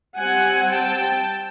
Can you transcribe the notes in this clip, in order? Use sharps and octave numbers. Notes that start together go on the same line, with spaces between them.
G3 C4 F#5 G#5
G5 A5